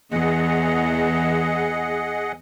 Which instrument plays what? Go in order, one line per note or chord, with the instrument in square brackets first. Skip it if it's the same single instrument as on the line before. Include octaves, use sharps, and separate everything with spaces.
[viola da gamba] E2 E3 [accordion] G#4 D#5 F#5